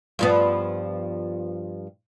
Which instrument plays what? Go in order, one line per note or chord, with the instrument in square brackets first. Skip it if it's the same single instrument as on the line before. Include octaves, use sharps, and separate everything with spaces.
[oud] G2 F3 B3